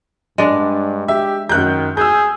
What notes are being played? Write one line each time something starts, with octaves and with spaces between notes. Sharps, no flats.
G2 G#3 D4
G4 E5
F#2 D#3 F#6 G6
G#4 E6 G6